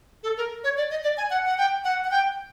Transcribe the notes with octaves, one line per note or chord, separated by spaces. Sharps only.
A4
A#4
C#5
D5
D#5
D5
G#5
F#5
F#5
G5
F#5
F#5
G5